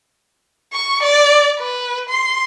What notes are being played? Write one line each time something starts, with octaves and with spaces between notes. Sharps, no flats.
C#6
D5
B4
C6